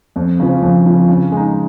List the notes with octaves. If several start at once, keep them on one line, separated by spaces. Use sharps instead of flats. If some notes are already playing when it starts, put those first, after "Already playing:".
F2
C#3 F3
F2
C#3 F3
C#3
G#3 D#4